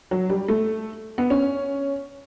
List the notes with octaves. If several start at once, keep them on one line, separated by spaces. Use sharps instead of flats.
F#3
G3
A3
B3
C#4